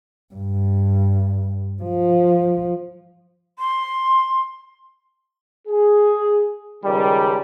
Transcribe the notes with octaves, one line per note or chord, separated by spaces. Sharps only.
G2
F3
C6
G#4
C#2 D#3 G3